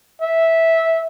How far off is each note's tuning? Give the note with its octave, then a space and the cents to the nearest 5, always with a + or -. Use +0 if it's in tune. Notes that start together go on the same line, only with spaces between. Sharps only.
E5 -10